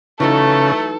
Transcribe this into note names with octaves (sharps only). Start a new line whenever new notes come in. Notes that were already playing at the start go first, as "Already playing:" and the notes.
C#3 E3 F#3 A3 D#4 A4